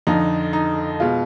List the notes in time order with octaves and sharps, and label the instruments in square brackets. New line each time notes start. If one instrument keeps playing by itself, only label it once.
[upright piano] F2 D3 F3 D#4
D#4
B2 G#3 F4